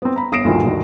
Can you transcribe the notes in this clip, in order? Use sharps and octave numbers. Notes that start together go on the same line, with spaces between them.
B3 C4
A#5 B5
G1 D#6 A#6 C7 D7 E7
D2 G2 A#2 D3 D#3 F3
D2 G2 D3 D#3